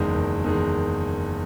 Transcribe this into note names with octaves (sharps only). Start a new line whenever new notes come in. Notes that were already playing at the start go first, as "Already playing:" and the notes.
Already playing: F#1 E2 D#3 G#3
F#1
E2 D#3 G#3